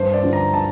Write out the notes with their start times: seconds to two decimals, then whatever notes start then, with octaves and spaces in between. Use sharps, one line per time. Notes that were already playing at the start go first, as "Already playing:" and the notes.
Already playing: G2 C5
0.13 D5
0.23 D3 F3
0.33 A#5
0.54 A5